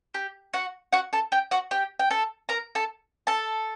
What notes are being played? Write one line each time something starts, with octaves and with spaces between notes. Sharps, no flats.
G4
F#4 F#5
F#4 F#5
A4 A5
G4 G5
F#4 F#5
G4 G5
G5
A4 A5
A#4 A#5
A4 A5
A4 A5